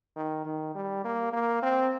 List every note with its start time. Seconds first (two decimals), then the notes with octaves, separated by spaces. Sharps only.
0.16 D#3
0.46 D#3
0.75 G3
1.05 A#3
1.33 A#3
1.63 C4